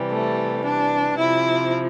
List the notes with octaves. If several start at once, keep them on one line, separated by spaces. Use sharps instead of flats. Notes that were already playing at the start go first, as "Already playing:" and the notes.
Already playing: C3 E3 G3
A3
D4
C3 F3 E4